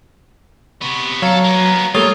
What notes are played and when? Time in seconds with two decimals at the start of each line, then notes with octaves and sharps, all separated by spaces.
0.82 C3 B3 C#6
1.22 F#3 A4 C#5 F5 A#5
1.44 A#3 B3
1.95 G3 A3 A#3 F4 A4 C#5 D#6 A6